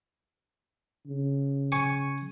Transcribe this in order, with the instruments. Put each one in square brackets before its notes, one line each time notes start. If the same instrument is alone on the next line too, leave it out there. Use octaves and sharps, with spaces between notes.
[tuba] C#3
[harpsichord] G#5 C#6